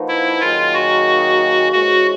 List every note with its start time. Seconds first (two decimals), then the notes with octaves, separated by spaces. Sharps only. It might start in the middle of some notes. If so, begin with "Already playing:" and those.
Already playing: F3 A#3 D#4 F#4 B4
0.08 E4
0.41 D#3 F#3 A#3 D#4 F4 G#4
0.74 F#4
1.72 G#2 E3 G#3 C#4 F#4